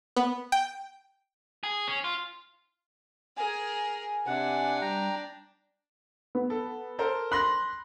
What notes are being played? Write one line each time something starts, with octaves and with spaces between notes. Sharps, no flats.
B3
G5
G#4
C#4
F4
G#4 A#4 G#5
C3 D4 F#5
G3 G5 A#5
B3
A4
A4 A#4 C5
B5 C6 F#6 A#6 F#7